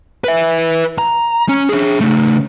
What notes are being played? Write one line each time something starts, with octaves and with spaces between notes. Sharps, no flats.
B4 E5
A#5
C#4
D4 G#4
C#3 A3